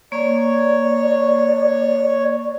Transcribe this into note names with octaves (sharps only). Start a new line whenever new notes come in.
A#3 C#5 D5